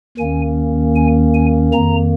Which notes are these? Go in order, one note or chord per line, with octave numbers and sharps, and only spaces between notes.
D#2 D#3 A#3 C#4 G#5
G#5
G#5
F2 D#3 A#3 A#5